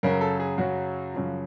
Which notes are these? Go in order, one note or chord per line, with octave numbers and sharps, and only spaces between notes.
F#2 C#3 F#3 A#4
A4
G#4
F#2 C#3 F#3 F#4
F#2 C#3 F3